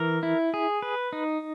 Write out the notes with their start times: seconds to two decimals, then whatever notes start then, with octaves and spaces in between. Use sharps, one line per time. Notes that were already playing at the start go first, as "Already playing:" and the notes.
Already playing: E3 A#4
0.23 E4
0.54 G#4
0.82 B4
1.13 D#4